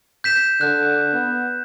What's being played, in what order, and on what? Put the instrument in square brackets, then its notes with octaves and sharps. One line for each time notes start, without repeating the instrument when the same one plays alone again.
[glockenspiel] G6 B6 E7
[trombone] D3 [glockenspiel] F#6
[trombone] B3